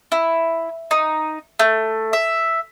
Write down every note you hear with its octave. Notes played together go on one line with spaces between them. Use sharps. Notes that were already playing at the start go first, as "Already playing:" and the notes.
E4
D#4
A3
E5